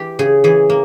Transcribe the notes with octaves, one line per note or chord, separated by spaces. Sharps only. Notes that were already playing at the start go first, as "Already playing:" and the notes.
Already playing: E3 G4
C#3 G#4
E3 G#4
A#3